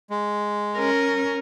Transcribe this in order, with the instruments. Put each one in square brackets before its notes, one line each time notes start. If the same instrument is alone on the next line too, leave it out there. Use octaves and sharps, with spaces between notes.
[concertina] G#3
[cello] C#4 A#4